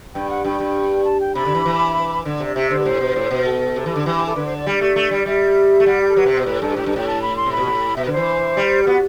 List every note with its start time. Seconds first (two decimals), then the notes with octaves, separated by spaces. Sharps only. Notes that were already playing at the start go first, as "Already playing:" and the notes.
0.14 G2 G5
0.30 F#5
0.44 G2 G5
0.60 G2
1.04 A5
1.20 G5
1.35 C3 B5
1.45 D3
1.55 E3
1.66 E3
2.25 D3
2.40 C3
2.45 D5
2.55 C3 E5
2.70 D3 C5
2.79 B4
2.85 A2 C5
3.01 B2
3.16 A2
3.31 B2
3.45 A4
3.76 C3
3.86 E3
3.96 D3
4.05 E3 G4
4.16 G4
4.26 A4
4.36 D3 B4
4.46 C5
4.57 D5
4.67 G3
4.81 A3 D5
4.96 A3
5.11 G3
5.26 G3 E5
5.80 A3
5.86 G3 F#5
6.01 G4
6.09 A4
6.16 F#3 B4
6.26 C3 C5
6.37 B2
6.46 A2 B4
6.61 G2 A4
6.76 A2 G4
6.86 G2 A4
6.96 A2 G5
7.07 A5
7.22 B5
7.36 C6
7.46 C3
7.52 B5
7.57 B2
7.67 A2
7.96 B2 E5
8.05 D3 B4
8.12 E3 C5
8.57 G3
8.83 G4
8.87 B3 F#4